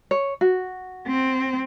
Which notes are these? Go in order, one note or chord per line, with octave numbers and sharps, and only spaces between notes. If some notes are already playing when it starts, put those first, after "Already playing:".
C#5
F#4
C4